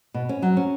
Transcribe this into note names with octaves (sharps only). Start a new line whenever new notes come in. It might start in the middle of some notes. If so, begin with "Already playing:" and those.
B2
C#4
F#3
C#4